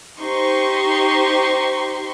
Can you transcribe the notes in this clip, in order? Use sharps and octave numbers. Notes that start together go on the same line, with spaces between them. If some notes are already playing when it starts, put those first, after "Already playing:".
D#4 G4 C5 C6 C#6